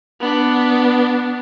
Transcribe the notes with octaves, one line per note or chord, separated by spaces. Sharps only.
B3 D4